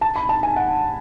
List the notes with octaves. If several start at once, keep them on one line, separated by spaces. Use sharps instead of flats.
A5
B5
A5
G#5
F#5